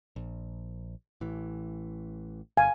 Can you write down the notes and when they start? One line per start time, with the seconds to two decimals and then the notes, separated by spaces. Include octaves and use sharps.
0.16 A#1
1.21 A1 E3
2.57 G1 F5 G#5